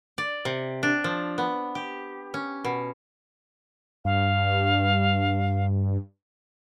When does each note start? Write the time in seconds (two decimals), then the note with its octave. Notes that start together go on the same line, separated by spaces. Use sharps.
0.18 D5
0.45 C3
0.83 D4
1.04 F3
1.38 B3
1.75 G4
2.34 C#4
2.65 B2
4.05 G2 F5